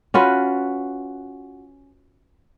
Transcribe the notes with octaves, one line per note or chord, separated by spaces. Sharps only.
C#4 F4 F#4 B4